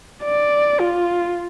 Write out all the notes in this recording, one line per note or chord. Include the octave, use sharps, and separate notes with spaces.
D5
F4